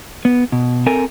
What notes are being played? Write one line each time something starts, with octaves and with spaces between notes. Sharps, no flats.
B3
B2
C4 A4 A#4 G#5